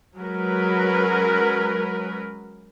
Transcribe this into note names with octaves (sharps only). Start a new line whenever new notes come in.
F#3 G#3 C#4 A#4 B4